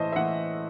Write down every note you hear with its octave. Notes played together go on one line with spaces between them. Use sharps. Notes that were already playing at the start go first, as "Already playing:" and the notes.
Already playing: A2 E3 C5 D#5 A5
E5
E3 F#5